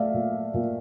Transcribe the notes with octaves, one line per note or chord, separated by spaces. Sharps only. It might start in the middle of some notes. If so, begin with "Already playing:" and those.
Already playing: A3 D5 E5 F5
A#2
A#2